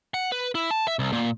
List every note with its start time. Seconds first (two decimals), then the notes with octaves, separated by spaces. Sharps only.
0.14 F#5
0.32 B4
0.55 E4
0.71 A5
0.88 E5
0.99 C2
1.12 A#2